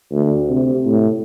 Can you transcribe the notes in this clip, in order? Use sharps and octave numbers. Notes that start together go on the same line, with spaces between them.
D2
C3
A2